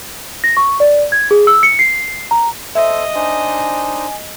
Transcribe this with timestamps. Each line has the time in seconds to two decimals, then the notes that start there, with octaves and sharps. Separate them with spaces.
0.44 A#6
0.57 C#6
0.80 D5
1.12 G#6
1.31 G#4
1.47 E6
1.63 C#7
1.79 C7
2.31 A#5
2.75 A4 C5 D#5 E5
3.15 D4 D#4 C5 G#5